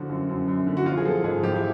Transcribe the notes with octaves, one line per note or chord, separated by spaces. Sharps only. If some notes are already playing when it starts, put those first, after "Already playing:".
Already playing: D3 F3 F#4
F#2
F#2
F#2
D3
F#4
F3 F4
G#4
F3 A4
G#2 G#4
F3 G4
E4